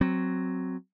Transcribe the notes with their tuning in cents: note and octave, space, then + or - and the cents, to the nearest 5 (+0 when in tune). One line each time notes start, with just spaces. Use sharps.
F#3 +0 C4 +0